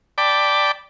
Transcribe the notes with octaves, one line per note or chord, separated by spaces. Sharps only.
D5 G5 A5 B5 D6